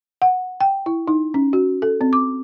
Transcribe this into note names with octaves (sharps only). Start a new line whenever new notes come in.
F#5
G5
E4
D#4
C#4
F#4
A4
C4
D6